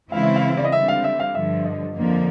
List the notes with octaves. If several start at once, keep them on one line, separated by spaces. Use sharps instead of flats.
C#3 E3 G#3 C4 E4 F5
E5
F5
D5
D#5
D3 G3 C4 E5
F5
E5
F5
G2 D3 F3 E5
D#5
F2 D3 F3 A#3